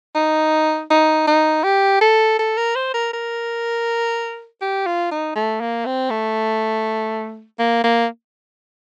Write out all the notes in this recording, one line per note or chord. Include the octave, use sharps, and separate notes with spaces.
D#4
D#4
D#4
G4
A4
A4
A#4
C5
A#4
A#4
G4
F4
D#4
A3
A#3
C4
A3
A#3
A#3